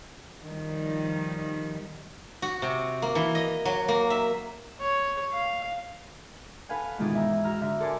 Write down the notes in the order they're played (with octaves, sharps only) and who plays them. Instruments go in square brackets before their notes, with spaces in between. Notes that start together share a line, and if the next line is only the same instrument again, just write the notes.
[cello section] D#3 F3 G3
[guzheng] F#4
C3
A#3
E3
D#5
F#3
A#3
E5
[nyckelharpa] C#5
F5
[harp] A4 B4 F5 F#5 G#5
G#2 B2 D#3 E3 F4
E5 A#5
F#4 A#5 F6
D3 E5
A4 A#4 C5 D5 G#5 A5